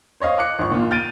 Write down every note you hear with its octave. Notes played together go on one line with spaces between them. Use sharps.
C5 C#5 D#5 F5
D6 F#6 C#7
G#1 F4 C#6
A#2 F4
F6 G6 A6 D7 D#7